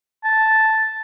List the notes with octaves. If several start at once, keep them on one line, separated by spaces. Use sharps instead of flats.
A5